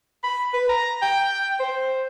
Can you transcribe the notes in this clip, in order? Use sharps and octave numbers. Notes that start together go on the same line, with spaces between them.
B5
B4
A#5
G5
C5